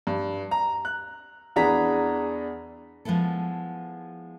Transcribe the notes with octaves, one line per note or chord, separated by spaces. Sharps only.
G2
A#5
F#6
E2 B3 D4 G#4 A#5 B6
F3 G#3 B3 E4 A4